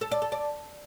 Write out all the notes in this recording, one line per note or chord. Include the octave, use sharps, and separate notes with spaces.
A4
D5
A4
D5